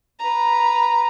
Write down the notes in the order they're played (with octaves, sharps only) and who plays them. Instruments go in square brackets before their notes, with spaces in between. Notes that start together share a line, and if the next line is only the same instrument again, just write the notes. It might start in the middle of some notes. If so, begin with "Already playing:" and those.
[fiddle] B4 A#5